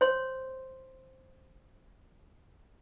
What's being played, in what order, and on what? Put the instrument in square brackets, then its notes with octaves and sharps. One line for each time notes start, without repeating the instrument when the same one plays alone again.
[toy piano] C5 C#5 C6